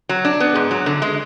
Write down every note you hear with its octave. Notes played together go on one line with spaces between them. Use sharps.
F#3
D4
B3
G#2
F#3
D3
G#3